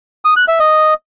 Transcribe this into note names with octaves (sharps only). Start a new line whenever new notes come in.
D#6
F#6
E5
D#5